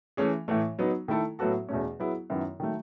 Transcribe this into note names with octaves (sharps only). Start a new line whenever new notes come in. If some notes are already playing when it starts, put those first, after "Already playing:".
E3 A3 C#4 G#4
A2 E3 A3
F#3 B3 D#4
D#3 A3 E4 A4
A2 F#3 B3 F#4 A4
E2 B2 A3 C#4
F#3 B3 E4 G#4
F#2 D#3 F#3 B3 E4
D#3 F#3 A3